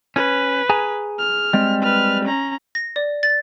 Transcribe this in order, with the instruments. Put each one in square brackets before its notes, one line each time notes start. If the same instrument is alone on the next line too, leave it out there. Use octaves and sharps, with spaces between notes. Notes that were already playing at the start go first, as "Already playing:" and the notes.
[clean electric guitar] C#4 [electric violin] B4
[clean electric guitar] G#4 G#5 A#5
[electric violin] F6
[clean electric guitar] G3 G#3 C4
[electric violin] B4 F6
C#4 A#5
[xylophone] A#6
D5
A6